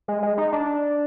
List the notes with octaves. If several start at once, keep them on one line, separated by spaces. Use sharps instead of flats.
G#3
G#3
D#4
D4